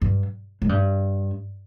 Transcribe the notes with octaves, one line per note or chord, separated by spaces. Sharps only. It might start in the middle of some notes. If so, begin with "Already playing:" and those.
G2
G#2
G2